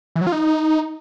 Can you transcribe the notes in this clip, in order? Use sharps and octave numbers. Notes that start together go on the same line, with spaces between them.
E3
F#3
F4
D#4